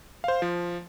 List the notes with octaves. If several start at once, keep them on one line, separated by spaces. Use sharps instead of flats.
C5 F5
F3